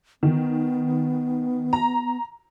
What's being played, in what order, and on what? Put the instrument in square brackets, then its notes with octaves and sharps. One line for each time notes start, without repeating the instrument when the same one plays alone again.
[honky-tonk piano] D#3 [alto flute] B3
[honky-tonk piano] A#5